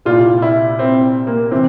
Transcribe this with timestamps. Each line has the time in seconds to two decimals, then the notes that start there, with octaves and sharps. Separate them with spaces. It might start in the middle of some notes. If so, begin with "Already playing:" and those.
0.05 C2 A#2 G3 F4
0.42 E4
0.79 C4
1.27 A#3
1.51 C3 E3 C4